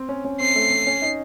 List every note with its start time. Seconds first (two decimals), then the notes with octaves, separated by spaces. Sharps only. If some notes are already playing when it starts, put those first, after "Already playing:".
Already playing: C4
0.09 C#4
0.25 C#4
0.40 C4 C7
0.55 A3
0.71 C4
0.87 C#4
1.02 D#4